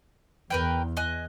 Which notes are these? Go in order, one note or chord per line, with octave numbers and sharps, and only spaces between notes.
E2 A#4 B4 G5
D#5 G#5 F#6